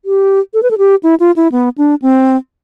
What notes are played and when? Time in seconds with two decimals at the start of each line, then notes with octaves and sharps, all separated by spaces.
0.05 G4
0.54 A4
0.63 B4
0.71 A4
0.78 G4
1.03 E4
1.20 F4
1.36 E4
1.52 B3
1.78 D4
2.02 C4